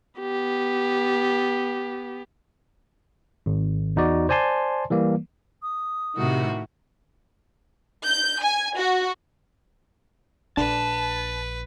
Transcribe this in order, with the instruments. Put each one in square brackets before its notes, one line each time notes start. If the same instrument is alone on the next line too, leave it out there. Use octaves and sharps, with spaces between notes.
[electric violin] B3 G4
[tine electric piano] G#1
E2 D#4 F#4 D5
C5 D5 G#5 A5 C6
E3 G3 A#3
[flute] D#6
[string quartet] A2 D#3 F#4 [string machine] C3
[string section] G6
G#5
F#4
[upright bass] A#1 [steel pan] D4 [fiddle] B4 [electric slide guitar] A5